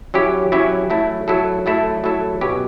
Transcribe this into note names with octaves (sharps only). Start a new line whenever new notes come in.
F#3 C#4 E4 G4
F#3 C#4 E4 G4
F#3 A3 E4 A4
F#3 A3 E4 A4
F#3 A3 E4 A4
F#3 A3 E4 A4
B2 F#3 C#4 G4 B4